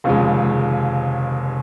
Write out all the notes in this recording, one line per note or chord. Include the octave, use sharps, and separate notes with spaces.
F1 D#2 C#3 F3 G#3